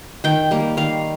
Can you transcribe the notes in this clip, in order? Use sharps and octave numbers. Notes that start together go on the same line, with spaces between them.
D#3 G5
G3 A#3
D#3 F5